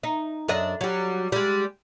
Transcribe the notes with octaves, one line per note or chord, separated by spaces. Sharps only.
D#4
F#2 D4 D#5
F#3 G3
G3 G#3